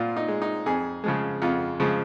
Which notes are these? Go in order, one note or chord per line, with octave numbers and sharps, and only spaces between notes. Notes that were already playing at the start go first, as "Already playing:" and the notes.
Already playing: A#2 F4
D#4
G#3
D#4
F2 G#4
C#3 F3 G#3
F2 F4
C#3 F3 G#3